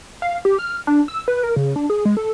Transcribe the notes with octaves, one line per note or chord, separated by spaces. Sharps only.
F5
G4
F6
D4
E6
B4
A#4
C#3
D4
G#4
G#3
A4